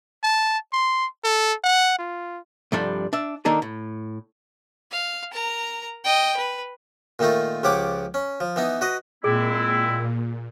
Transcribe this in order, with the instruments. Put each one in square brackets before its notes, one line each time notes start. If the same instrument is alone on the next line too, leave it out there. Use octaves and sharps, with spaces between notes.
[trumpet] A5
C6
A4
F#5
F4
[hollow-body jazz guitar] C2 G2 F3 G3 D4 A4
D4 E5
D#3 A#3 D4 D#4 A4
A2
[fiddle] F5
A#4 A#5
D#5 G5
B4
[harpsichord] A#2 D#3 A3 D#4 F4
C#2 F3 G4 C#5 F#5 D6
C#4
F3
E3 B3 D#4
F#4 B4 D#5
[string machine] A#2 [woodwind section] G#3 C4 E4 [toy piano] G#4